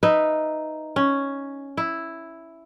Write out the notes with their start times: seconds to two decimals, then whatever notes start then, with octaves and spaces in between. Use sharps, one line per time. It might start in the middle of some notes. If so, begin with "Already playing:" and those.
0.03 D#4 B4 E5
0.96 C#4
1.77 E4